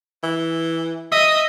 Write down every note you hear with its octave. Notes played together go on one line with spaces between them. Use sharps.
E3
D#5 E5 D#6